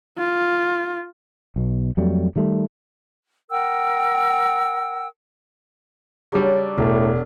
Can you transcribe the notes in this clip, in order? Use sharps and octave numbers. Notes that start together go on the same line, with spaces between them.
F4
B1 B2
F2 F#3 G3 A3
D#3 G3 A3
A#4 F#5 G5 E6
C#3 F#3 G3 D4 D5
E1 A2 A#4